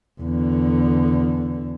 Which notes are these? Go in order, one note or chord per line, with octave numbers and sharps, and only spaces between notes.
E2 D3